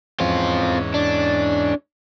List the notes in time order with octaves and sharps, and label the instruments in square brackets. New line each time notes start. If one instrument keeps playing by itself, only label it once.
[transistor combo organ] E2 G#2 C#4 [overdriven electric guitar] C4 F4
[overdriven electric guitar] D4